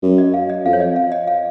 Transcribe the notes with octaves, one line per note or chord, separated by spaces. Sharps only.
F#2
D#5
F5
D#5
F2 F5
C#5
D#5
F5
D#5
F5